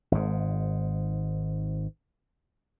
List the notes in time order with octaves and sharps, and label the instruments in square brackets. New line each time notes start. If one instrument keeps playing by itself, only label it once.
[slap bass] G#1 G#2